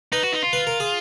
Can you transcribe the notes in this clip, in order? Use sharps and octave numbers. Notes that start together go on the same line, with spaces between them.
D#4 B4
F#4
D#4
F4
B4
A#4
G#4